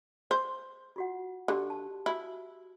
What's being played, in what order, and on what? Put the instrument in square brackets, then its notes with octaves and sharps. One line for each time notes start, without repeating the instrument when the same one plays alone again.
[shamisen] C5
[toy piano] F4 F#4 F#5
[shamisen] D3 [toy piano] G4
[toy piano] A5
[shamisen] E4 [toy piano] F#4